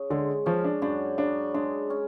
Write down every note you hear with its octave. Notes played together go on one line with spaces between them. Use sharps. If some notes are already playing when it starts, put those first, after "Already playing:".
Already playing: C#3
D3 G#3
F3 C#4
D4
F#2 D4
C#3 D4
G#3 D4
C#4